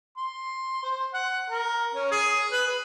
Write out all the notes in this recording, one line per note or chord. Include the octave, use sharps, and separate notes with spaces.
C6
C5
F#5
A#4
C#4
G#4
B4
B4